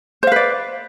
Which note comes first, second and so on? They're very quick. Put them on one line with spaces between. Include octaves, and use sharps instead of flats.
C5 F5 B4 D5